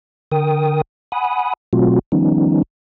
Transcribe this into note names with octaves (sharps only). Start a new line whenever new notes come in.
D3 A#4 G5 D#6
F#5 G#5 B5 D#6
B2 F#3 A3 C4 F4 F#4
D#3 F3 G3 B3 C#4 D#4